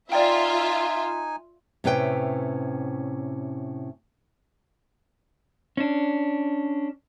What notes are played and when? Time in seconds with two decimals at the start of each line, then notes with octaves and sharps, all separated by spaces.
0.12 D#4 F4 D5 E5 G5 G#5
1.84 A2 C3 C#4 B4 G5
5.77 C#4 D4